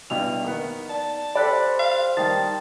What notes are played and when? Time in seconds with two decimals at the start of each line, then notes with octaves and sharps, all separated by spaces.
0.10 G2 B2 E3 F7
0.44 D#3 B3
0.90 D5 A5
1.35 G4 A4 C5 D5 B5 F#6 B6
1.79 F5
2.17 D#3 G3 G5 A5 D#6 A6